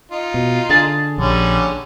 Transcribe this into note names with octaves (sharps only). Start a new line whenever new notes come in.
D#4 F4
B2
D3 G#4 A5
A#1 D3 G3 C#4